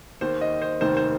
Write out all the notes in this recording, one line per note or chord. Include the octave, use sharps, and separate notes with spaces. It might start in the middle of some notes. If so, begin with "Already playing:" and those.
D#2 D#3 C5
D#5
C5
F1 D#2 D#3 C5
C5